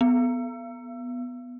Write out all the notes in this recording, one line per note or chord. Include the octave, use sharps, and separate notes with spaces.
B3